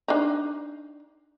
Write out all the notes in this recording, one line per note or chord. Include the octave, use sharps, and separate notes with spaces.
D4 D#4